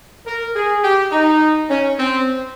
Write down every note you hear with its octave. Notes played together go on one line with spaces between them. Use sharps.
A#4
G#4
G4
D#4
C#4
C4